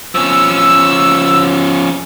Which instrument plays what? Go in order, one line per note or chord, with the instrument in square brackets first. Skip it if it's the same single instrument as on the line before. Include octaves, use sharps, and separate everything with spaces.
[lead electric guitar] F3 C#4 [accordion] E6